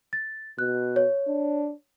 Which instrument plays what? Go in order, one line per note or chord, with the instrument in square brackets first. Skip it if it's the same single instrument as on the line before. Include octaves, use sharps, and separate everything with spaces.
[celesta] A6
[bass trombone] B2 [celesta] F#6
[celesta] C#5
[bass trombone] D4